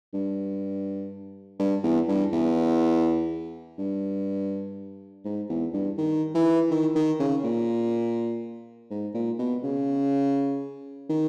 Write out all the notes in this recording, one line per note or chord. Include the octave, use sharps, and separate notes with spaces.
G2
G2
E2
G2
E2
G2
G#2
E2
G2
D#3
E3
D#3
D#3
C#3
A#2
G#2
A#2
B2
C#3
D#3